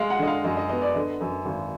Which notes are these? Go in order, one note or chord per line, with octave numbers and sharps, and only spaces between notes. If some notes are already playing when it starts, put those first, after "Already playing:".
Already playing: G#3 F5
F#5
D3 D#5
F5
F#2 D#5
D#5
B3 D#5
D5
D3 D#5
F#2
G#1